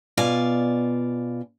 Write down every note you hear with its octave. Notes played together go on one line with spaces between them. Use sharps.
B2 F4 D5 G#5